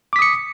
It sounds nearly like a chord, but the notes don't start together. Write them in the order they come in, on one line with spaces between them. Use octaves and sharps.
D6 B6 D#6 C#7